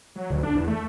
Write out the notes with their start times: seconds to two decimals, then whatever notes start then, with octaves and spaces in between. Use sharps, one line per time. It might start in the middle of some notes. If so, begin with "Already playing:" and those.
0.15 F#3
0.30 D2
0.43 D4
0.55 E2
0.68 A3